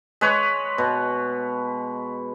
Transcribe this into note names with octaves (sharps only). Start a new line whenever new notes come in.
G#3 B4 C#5
B2